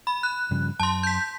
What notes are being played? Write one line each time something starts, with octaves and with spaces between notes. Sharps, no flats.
B5
F#6
G2 C#3 F3
F#2 A5 C6
G6 B6